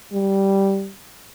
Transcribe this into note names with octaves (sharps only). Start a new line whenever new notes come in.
G3